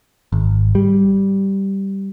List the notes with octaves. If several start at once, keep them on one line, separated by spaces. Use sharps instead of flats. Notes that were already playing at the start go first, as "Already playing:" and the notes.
G#1
G3